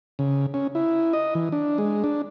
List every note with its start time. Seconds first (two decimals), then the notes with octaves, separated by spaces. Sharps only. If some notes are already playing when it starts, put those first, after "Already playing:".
0.19 C#3
0.54 C#4
0.75 E4
1.13 D#5
1.35 E3
1.52 D4
1.78 G#3
2.04 D4